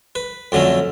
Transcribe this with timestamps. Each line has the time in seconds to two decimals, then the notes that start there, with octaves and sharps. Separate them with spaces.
0.15 B4
0.52 F2 D3 F#3 A3 C#4